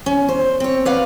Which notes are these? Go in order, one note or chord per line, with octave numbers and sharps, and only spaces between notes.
C#4
C5
C4 C#5
B4 C#5 D5 F5 F#5